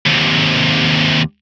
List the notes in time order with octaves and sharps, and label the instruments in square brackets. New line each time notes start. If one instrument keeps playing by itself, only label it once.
[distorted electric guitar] D#2 C3